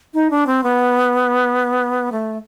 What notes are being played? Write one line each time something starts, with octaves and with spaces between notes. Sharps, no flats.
D#4
D4
C4
B3
A3